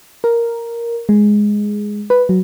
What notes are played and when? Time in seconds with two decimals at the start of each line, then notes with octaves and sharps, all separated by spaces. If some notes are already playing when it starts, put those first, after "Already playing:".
0.24 A#4
1.09 G#3
2.10 B4
2.29 F#3